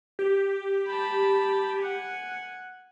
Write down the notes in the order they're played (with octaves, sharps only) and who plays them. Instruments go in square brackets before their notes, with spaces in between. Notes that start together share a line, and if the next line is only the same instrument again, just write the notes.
[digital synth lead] G4
[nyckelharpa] A5 B5
F#5 G#5